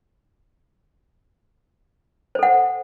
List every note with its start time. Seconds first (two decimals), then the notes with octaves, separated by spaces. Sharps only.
2.35 C5
2.39 A4
2.43 F#5